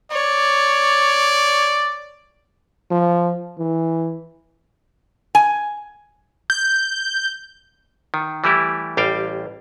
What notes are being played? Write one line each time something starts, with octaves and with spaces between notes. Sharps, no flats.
C#5 D5
F3
E3
G#5
G6
D#3
E3 G3 A3 E4 G4
A1 G3 F5 G5